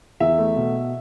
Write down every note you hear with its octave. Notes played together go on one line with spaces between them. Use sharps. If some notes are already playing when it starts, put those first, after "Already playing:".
E2 E5
A3
B2